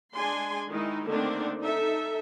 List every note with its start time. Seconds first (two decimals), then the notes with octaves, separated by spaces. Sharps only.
0.14 G#3 D4 G#5 C6
0.71 D#3 G#3 D#4 E4
1.06 D3 D#3 A3 A#3 C4 D4
1.61 D#4 A4 E5